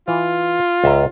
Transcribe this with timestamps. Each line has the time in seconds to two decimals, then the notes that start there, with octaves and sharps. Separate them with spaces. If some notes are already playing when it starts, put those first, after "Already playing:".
0.08 E3 F4
0.84 C#2 E5 A#5